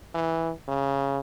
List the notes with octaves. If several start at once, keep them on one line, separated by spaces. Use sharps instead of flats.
E3
C#3